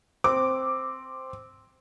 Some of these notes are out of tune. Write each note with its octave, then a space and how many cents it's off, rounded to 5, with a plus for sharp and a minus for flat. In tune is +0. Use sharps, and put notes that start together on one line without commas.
C4 +0 D6 +0